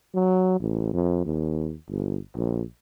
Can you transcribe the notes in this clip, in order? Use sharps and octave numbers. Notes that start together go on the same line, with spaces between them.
F#3
A1
F2
D#2
G1
A#1